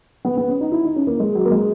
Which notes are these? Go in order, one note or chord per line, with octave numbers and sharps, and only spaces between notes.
B3
B3
C#4
D#4
E4
D#4
C#4
A#3
G#3
F#3
A#3
G#3